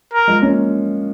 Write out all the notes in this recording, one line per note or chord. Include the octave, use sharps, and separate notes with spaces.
A#4
F3 G#3
A#3 C#4